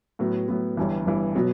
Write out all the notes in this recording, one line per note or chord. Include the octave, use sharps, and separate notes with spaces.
A2 F#3 B3
A2 F#3 B3
G1 G2 E3
G1 G2 E3
B2 F#3 B3